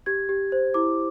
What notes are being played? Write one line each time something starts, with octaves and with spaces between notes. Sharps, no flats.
G4 G#6
G4
C5
E4 D6